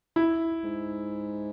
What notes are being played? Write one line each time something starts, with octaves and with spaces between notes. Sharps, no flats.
E4
G#2